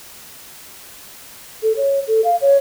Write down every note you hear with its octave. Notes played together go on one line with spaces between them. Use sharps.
A4
C#5
A4
F5
C#5